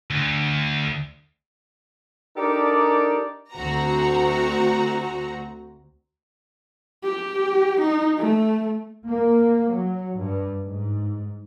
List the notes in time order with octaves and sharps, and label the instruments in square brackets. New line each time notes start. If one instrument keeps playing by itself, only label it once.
[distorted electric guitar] D2
[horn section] D4 D#4 G4 A4 A#4 D5
[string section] D2 C4 F#4 A#5
[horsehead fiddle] G4
D#4
A3
[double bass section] A#3
F#3
G2
G#2